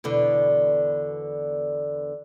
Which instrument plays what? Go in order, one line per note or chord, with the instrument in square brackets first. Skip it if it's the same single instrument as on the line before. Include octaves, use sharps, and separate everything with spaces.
[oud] E2 B2 D3